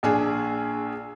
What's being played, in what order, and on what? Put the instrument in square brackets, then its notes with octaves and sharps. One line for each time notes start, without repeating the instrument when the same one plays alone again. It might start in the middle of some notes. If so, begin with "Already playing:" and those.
[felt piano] A#1 D4 G#4